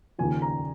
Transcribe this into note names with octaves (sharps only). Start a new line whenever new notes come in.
D#2 C#3 F3 G#5
A#5